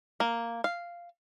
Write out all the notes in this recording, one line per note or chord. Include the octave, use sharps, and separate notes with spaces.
A#3
F5